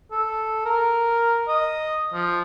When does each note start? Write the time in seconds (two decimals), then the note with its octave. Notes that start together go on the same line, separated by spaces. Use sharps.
0.12 A4
0.66 A#4
1.48 D#5
2.14 F3